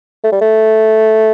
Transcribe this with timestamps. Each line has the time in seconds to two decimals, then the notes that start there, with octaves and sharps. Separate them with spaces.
0.24 A3
0.32 G3
0.41 A3